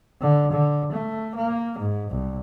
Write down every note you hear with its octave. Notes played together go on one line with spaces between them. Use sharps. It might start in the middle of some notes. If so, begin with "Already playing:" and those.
D3
D3
A3
A#3
G#2
C2